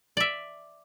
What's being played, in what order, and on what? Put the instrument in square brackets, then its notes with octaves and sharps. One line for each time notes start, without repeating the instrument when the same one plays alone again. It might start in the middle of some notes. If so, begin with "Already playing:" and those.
[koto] D5 E5